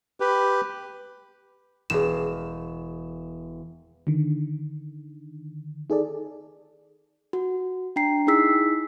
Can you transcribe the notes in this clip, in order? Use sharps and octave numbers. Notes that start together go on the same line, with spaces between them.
G4 B4
E1 G#4 E7
D3 D#3
D#4 G#4 A4 D5
F#4
D4 G5 A#5 C7
D#4 E4 G#4 E6 B6